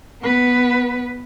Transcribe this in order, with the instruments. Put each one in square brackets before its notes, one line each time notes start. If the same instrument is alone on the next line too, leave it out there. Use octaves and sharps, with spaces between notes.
[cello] B3 B4